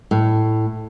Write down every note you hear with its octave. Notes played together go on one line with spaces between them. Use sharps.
A2